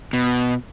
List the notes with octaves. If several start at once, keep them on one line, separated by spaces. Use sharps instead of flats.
B2